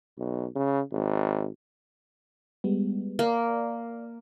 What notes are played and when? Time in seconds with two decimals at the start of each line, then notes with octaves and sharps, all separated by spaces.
0.18 B1
0.56 C#3
0.92 G#1
2.64 G3 G#3 B3
3.19 A#3 A#4 D5